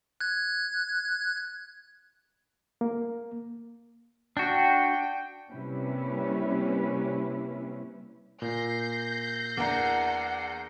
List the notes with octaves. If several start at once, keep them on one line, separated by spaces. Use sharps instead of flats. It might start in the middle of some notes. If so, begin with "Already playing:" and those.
F#6 G#6
A#3
D4 F#4 G5
C3 G3 A#3 C#4 E4 B4
A#2 G6 A#6 C7
E2 A#3 D4 A#4 F#5 A#5